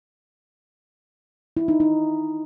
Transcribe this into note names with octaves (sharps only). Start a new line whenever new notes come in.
E4
D#4
D#4